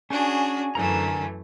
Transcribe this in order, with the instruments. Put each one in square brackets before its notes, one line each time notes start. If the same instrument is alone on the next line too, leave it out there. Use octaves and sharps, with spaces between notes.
[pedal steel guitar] C#4 [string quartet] D4 F#4 G#4 [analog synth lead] G#5
[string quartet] F#2 E3 A3 [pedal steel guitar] D3 A#4 A#5